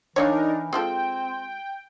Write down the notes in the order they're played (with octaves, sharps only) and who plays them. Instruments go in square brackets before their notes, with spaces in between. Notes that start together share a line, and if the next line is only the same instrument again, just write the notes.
[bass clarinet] E3 [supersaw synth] D4 D#4 A#4 [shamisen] C#5 D#5 F5
[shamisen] G#3 F4 A4 [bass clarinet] C4 [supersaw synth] G5